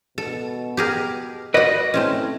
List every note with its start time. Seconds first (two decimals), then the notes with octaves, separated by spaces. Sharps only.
0.18 B2 A4
0.77 G4 G#4 A#4
1.54 F#4 B4 D5 D#5
1.94 A3 C4 C#4 E4